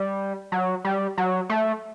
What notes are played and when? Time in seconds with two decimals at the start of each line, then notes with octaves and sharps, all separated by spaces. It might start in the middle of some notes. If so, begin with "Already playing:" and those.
Already playing: G3
0.52 F#3
0.84 G3
1.18 F#3
1.49 A3